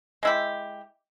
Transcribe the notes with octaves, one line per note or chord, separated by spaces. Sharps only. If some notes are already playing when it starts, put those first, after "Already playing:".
G#3 E4 G4